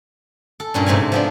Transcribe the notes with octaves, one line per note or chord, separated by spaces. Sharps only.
A4
G2 A#2 C#4
G#2 C3 A3 A4 G#5
F3 B3 D4